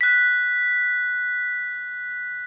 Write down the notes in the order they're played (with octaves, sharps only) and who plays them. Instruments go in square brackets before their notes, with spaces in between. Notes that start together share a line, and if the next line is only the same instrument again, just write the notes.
[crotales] F#6 B6